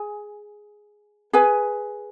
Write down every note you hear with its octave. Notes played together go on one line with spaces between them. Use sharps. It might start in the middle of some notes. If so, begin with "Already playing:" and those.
Already playing: G#4 G#5
G#4 B4 G#5